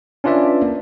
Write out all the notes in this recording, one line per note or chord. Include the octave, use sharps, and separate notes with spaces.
C#4 D4 F4 B4 D5 E5
A#3